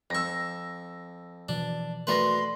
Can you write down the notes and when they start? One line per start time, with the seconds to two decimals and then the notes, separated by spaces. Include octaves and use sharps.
0.10 F2 C#6 E6 A#6
1.49 B2 E3 F3 D4
2.07 A3 F#4 A#4 B4 D5 C6 A#6